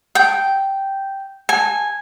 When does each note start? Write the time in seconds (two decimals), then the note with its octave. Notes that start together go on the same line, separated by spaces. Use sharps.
0.15 G5
1.49 G#5